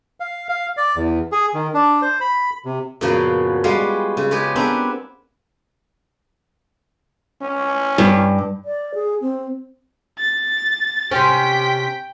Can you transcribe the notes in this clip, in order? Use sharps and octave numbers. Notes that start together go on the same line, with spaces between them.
F5
F5
D5
E2
G#4
D#3
D4
C5
B5
C3
F#2 A#2 C#3 F3 F#3 B3
G3 G#3 B3 F4 F#4 F5
C#3
G#3 G4 G#4 B4 C#5
B3 C4 D4 A#4 B4
C#4
G2
D5
G#4
C4
A6
C3 C#4 G5 B6